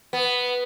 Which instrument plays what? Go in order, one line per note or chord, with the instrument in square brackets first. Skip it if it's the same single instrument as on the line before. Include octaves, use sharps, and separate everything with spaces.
[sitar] B3